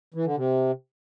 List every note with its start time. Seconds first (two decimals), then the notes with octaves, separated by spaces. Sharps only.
0.14 E3
0.25 D3
0.36 C3